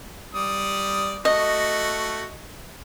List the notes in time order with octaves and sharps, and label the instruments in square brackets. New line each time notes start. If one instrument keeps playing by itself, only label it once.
[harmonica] G3 D5 D#6
[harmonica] A3 F#4 [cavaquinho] D#5